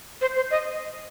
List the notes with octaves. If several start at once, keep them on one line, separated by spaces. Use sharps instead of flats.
C5
C5
D#5